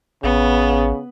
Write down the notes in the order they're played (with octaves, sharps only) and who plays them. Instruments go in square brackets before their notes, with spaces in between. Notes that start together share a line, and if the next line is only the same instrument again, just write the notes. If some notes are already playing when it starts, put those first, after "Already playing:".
[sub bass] A1 [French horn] C#3 [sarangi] B3